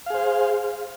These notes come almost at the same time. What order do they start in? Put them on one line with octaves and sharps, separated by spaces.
F5 G#4 C5